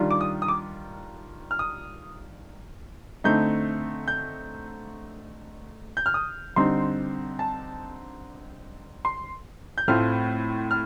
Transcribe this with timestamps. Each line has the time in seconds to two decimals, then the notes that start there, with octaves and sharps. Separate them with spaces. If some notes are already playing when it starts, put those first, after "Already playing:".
Already playing: D#3 G3 D4 F4
0.11 D6
0.21 D#6
0.42 D#6
0.48 D6
1.51 F6
1.59 D#6
3.24 D3 A3 C4 D#4 G6
4.08 G6
5.97 G6
6.06 F6
6.14 D#6
6.56 D3 G3 C4 D#4 C6
7.39 A5
9.05 C6
9.78 G6
9.88 A2 A3 C4 F4 F6
10.71 F6